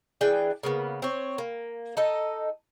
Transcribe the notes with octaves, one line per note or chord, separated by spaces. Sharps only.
E3 D4 G#4 G5
C#3 A#3 B3
C4 C#5
A#3
D#4 A4 D#5